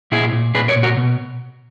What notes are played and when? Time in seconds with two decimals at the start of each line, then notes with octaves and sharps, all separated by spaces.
0.12 A#2 E4 G#4
0.33 A#2
0.55 A#2 G#4 B4
0.68 A#4 C#5
0.76 A#2
0.83 F#4 A#4
0.97 B2